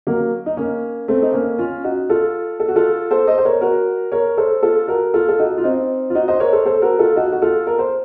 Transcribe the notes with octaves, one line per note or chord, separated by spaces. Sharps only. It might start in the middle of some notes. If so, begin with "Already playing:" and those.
F#3 A#3
D#4
A#3 C#4
A3 C4
D#4
A#3 C#4
C#4 F4
D#4 F#4
F4 A4
A4
F#4
F4 A4
A4 C5
C5 D#5
C5
A#4 C#5
F#4 A#4
A#4 C#5
A4 C5
F4 A4
F#4 A#4
F4 A4
A4
D#4 F#4
F4
C4 D#4
F4
D#4 F#4
C5 D#5
A#4 C#5
A4 C5
A4 C5
F#4 A#4
F4 A4
D#4 F#4
F#4
F4 A4
A#4
C5